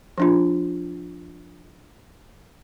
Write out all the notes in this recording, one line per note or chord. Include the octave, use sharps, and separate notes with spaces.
F3 D4 F4